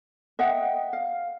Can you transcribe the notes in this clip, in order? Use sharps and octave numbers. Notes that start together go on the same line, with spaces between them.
D#5 E5 F#5 G5
F5